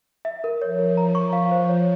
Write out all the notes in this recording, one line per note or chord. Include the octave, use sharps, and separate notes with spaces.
E5
A#4
F3 C#5
A#4
A#5
C#6
F3 F5
C5
C#5